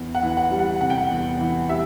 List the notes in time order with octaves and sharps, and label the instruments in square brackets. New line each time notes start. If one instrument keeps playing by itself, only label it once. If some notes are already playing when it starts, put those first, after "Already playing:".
Already playing: [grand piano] E2
[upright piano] F#5
[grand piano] E3
[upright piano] F#5
[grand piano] G3
[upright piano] F#5
[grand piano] C3 [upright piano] F#5
[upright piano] G5
F#5
[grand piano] E2
E3
[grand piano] G3 [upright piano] E5